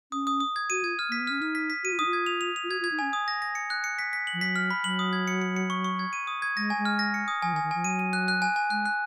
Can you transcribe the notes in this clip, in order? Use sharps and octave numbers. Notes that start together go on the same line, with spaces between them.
C#4 D#6
D#6
D#6
G#6
F#4 D#7
F4 G#6
F6
A#3 B6
B3
C#4 F6
D#4 F6
B6
B6
F#4 D#7
F4
D#4 D#6
F4
G#6
F7
F7
F7
F4
F#4 G#6
F4
G#6
D#4
C#4 G#5
D#6
A#6
A#6
C#7
F#6
C#7
B6
B6
F#7
F3
F#3 B6
F6
B5
F#3 F#7
D#6
G#6
C#7
C#7
C#7
C#6
C#6
G#6
D#7
D#6
G#6
G#3 A#6
G#5
G#3
F6
A#6
C#7
D#6
F3 G#5
D#3
G#5
D#3
F3 G#5
F#3 D#7
D#7
F#6
F#6
G#5
G#5
G#3 F#6
F#6